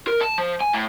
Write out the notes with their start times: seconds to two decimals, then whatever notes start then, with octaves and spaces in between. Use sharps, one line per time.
0.07 A#4
0.21 A5
0.38 F3
0.61 G#5
0.73 A2